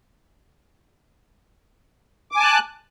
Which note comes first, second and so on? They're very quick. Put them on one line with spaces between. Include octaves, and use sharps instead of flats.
D6 G#5 A5 F#6